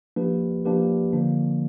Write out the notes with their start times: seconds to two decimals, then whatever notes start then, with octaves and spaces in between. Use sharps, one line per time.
0.16 F3 A#3 D4 G4 B4
0.65 F3 A#3 D4 G4 B4
1.13 D3 F3 A#3 D4